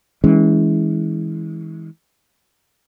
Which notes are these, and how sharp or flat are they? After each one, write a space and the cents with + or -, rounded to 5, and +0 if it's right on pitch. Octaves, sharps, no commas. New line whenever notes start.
E3 -30 G#3 -5 C#4 +0